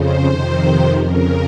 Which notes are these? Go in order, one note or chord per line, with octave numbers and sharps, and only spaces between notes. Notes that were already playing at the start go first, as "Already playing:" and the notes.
Already playing: F2 C#3 C5
F2 C3 D#3
F2 C#3 A#4